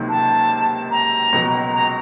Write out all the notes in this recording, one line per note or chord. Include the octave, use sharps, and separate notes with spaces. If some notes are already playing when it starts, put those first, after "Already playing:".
Already playing: C#2 C3 D#3 F#3 A#3
A5
A#5
C#2 B2 F#3
A#5